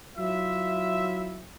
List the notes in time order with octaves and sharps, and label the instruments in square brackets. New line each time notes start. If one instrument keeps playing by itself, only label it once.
[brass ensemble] F#3 E4 F4 E5